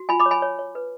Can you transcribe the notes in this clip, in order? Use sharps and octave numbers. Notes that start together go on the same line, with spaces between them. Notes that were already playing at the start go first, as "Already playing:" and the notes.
Already playing: F#4
F4 G#5 B5
B5 D6
C#5
G#5 B5
C#5
C#5
B4